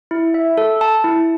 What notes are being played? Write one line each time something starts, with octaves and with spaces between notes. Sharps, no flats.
E4
E5
A4
A5
E4